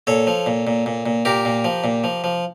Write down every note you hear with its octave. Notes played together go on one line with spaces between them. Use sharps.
A#2 A4 C#5
F3
A#2
A#2
A#2
A#2
A#2 G4 A#4
A#2
F3
A#2
F3
F3